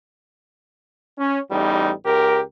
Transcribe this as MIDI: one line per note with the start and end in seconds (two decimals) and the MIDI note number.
1.18 1.39 61
1.51 1.91 33
1.51 1.91 40
1.51 1.91 55
1.51 1.91 63
2.06 2.42 37
2.06 2.42 67
2.06 2.42 70